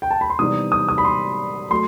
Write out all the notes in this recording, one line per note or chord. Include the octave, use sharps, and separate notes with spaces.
G5
A5
B5
C6
C3 E3 G3 B3 D#4 D#6
D#6
D#6
B5
C6
F#3 A3 C6